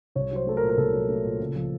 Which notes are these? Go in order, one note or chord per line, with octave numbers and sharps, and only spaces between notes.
C2 C#5
F#3 C5
A3 A4
A#4
A#2
A#4
C2 A4
F#3
A3
A#2
C#2
F3